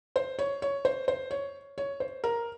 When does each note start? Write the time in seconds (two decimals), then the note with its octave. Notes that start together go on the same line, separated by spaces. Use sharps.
0.16 C5
0.39 C#5
0.62 C#5
0.85 C5
1.08 C5
1.31 C#5
1.78 C#5
2.00 C5
2.24 A#4